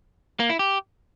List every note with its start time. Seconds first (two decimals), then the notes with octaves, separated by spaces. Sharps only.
0.40 A#3
0.50 E4
0.59 G4